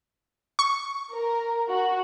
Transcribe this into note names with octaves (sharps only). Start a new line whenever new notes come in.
C#6
A#4
F#4